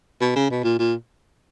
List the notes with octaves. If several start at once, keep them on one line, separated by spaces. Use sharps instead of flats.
B2
C#3
B2
A#2
A#2